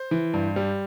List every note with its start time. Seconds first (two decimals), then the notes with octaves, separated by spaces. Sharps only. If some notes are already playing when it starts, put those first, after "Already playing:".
Already playing: C5
0.11 E3
0.34 G2
0.56 G3